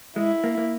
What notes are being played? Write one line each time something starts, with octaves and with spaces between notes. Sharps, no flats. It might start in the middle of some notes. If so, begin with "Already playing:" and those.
G#3 E4
A#3
A#3